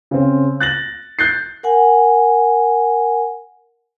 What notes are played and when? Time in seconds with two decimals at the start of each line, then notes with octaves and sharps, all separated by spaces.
0.11 C#3 C4
0.60 F#6 A6 A#6 F#7
1.19 F#6 G6 A6 C7
1.63 A#4 F#5 G#5